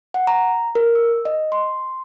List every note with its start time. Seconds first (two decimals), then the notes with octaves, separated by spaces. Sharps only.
0.14 F#5
0.27 A#5
0.75 A#4
0.95 E6
1.25 D#5
1.52 C6